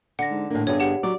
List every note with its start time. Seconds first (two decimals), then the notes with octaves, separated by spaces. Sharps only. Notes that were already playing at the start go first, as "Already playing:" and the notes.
0.19 D3 F#5 A#6
0.31 G#2
0.50 A2 D3 A#3
0.67 G2 B3 G#4 C#5
0.80 G4 F#5
1.03 F#3 D5